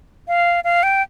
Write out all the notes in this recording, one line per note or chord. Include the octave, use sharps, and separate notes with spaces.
F5
F5
G5